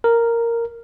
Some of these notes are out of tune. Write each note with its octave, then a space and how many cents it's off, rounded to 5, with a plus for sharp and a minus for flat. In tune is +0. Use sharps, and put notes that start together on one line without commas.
A#4 -5